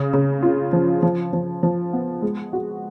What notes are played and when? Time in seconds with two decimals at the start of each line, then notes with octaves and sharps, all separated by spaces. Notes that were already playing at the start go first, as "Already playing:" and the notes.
Already playing: C#3
0.14 C#3
0.43 F4
0.73 F3
1.03 F3
1.33 F3
1.63 F3
1.93 B3
2.22 G#3
2.53 F#4